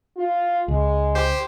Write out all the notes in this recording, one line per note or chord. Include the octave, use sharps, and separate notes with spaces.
F4
C#2 G#3
G4 C5